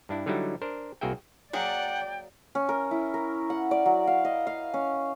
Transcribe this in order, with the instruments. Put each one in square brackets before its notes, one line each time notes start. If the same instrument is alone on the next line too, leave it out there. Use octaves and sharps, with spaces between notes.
[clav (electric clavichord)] G2 D4 E4
D3 F#3 G3 D#4 E4
D4 A#4 C5
C2 A#3 F#4 G#4 E5 G5
[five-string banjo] F#3 A#3 G#4 [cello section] D5 [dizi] F#5 [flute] G5
[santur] C#4
A#4
E4
A#4
F#5
D5
F#3
F5
D#5
F5
C#4